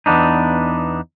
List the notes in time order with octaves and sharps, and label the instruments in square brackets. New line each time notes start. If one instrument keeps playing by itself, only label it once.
[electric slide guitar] E2 B3 D4 D#4